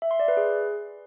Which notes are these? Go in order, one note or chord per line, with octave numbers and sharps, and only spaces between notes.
E5
C6
D5
B4
G#4